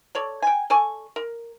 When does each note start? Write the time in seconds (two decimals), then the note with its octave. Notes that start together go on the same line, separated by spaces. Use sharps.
0.15 A4 C#5 D5
0.42 G5 G#5
0.70 A4 D5 G#5 C#6
1.16 A#4